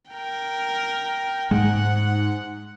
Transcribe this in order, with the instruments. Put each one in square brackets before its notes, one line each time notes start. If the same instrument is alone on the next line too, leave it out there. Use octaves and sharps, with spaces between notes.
[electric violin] A#4 G5
[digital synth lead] G#2 [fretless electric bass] G#3 [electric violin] F#5